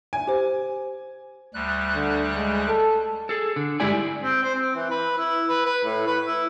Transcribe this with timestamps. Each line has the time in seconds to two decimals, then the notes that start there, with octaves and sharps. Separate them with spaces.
0.13 G#5
0.27 G4 C5
1.54 D2 G3 F#6
1.95 D3
2.36 G#3
2.68 A4
3.29 G#4 A4
3.56 D3
3.80 G2 G#3 E4 G4 D5 G#5
4.24 C4
4.43 C5
4.55 C4
4.75 E3
4.91 B4
5.18 E4
5.49 B4
5.66 B4
5.85 A2
6.07 B4
6.26 E4